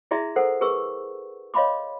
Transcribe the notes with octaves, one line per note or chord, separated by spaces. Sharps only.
E4 G#4 D5 E5 A#5 C6
A4 A#4 C5 F#5
G#4 A#4 B4 C#6 E6
C#5 D#5 F5 B5 C6 D6